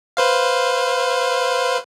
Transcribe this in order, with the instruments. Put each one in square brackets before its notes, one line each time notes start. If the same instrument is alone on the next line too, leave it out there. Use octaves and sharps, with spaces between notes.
[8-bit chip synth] B4 C5 F5